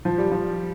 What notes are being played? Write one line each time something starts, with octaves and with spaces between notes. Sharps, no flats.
F3
G3
F3